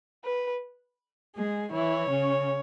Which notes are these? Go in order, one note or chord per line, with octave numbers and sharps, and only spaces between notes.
B4
G#3 G#4
E3 E4 C#5
C#3 C#4